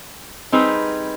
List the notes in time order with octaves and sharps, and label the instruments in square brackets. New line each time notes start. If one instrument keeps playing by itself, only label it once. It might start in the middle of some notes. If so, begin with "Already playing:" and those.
[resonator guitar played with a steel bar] G3 C4 D#4 G#4 B4